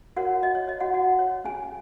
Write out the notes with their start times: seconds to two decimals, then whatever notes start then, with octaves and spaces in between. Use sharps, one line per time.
0.16 F#4 A#4 C#5 F#5
0.42 F#4 D#5
0.55 C#5
0.68 C#5 D#5
0.80 F#4 F#5
0.94 F#4 F#5
1.19 C#5
1.45 C#4 G#4 G#5